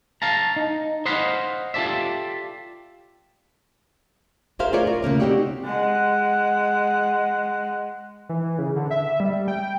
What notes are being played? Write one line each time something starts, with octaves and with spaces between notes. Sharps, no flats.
F5 A5 A#5
D#4
C5 D#5 F5 F#5 B5
F4 G4 A4 D5 E5
F#4 G#4 A#4 C5 E5 F5
A3 F4 G#4 A#4 C#5 D5
A#4
C#3 A3 A#3 C#4
C4 D#4 F#4 G4 C#5 D5
G#3 F#5
E3
C#3
D3
E5
G3
G5